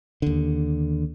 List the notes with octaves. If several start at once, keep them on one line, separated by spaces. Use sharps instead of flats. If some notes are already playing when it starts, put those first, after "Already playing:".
D#2 D3